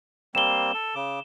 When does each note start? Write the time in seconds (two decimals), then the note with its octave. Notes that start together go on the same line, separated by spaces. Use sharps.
0.35 G3 A#3 C4 E7 G7
0.74 A4
0.95 C#3 D6